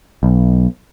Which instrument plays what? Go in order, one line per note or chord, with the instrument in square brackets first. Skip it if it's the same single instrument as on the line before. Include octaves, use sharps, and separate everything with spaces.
[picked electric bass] B1